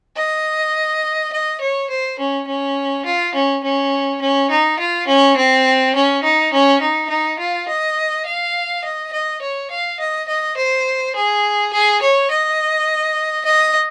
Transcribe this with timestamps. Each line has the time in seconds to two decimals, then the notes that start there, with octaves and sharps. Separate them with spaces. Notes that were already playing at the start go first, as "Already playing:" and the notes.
0.17 D#5
1.32 D#5
1.60 C#5
1.90 C5
2.19 C#4
2.47 C#4
3.05 F4
3.34 C#4
3.64 C#4
4.22 C#4
4.51 D#4
4.79 F4
5.07 C#4
5.37 C4
5.95 C#4
6.23 D#4
6.53 C#4
6.81 D#4
7.09 D#4
7.39 F4
7.68 D#5
8.26 F5
8.84 D#5
9.13 D#5
9.42 C#5
9.71 F5
10.00 D#5
10.28 D#5
10.57 C5
11.15 G#4
11.73 G#4
12.02 C#5
12.31 D#5
13.45 D#5